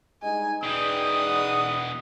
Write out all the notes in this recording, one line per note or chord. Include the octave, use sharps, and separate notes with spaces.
G2 G#3 D#4 G#5
B2 E3 D#4 G#4 D5 G5 D#6
F#5